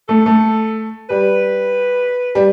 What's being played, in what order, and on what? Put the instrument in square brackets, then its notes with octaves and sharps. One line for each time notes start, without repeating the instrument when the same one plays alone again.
[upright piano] A3 [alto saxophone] A4
[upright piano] A3
[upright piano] G3 [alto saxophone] B4
[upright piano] G3